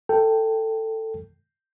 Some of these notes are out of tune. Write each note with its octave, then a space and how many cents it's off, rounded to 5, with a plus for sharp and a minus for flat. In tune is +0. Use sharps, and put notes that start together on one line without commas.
A4 +15 G5 +0